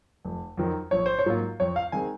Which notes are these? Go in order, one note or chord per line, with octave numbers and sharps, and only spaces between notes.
F1
F2 D#3 F#3
A#1 C#5
C5
C#5
G#2 F#3 A#3 F4
F2 C#5
F5
D#3 G#3 C4 G#5